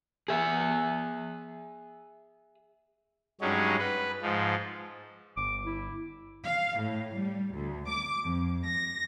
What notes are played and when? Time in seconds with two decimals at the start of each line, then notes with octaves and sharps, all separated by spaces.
0.28 G#4 E5
3.41 G2 F#3 G#3 C#4 D#4
3.78 B4
4.22 G#2 F3
5.37 G1 D6
5.65 E4
6.45 F5
6.81 A2
7.18 G3
7.55 D2
7.89 D6
8.24 F2
8.66 A#6